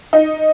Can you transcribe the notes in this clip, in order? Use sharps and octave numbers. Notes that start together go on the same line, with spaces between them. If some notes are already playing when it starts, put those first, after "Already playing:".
D#4